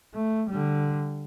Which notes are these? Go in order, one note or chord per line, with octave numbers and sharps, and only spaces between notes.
A3
D3 G3